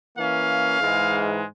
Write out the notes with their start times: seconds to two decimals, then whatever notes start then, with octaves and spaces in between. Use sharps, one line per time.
0.16 E3 A#3 C#4 F5
0.80 G#2 E3 G#3